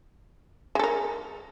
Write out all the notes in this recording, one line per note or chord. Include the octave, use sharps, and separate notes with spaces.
G#3 A4 A#4